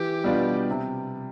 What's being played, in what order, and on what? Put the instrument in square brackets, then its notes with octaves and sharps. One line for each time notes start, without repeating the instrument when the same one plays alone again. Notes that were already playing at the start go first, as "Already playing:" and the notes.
Already playing: [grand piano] E3 [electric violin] G4
[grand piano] B2 G3 B3 D4 F4
C3